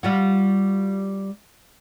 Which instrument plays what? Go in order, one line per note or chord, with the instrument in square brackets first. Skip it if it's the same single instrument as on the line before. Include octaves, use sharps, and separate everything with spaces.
[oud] G3 F4 F#4